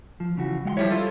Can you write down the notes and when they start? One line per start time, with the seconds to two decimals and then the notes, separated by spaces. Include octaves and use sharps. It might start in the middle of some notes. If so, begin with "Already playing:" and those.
0.20 F3
0.37 C#3 E3 F#4
0.65 G#3 F#5 C6
0.77 F3 G3 E4 C#5
0.91 F4 A4